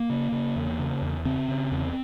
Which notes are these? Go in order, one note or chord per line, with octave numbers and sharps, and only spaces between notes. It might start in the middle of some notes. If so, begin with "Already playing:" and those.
Already playing: A#3
C#3
C#3
E2
C#3
E2
C#3 C4
C#3
E2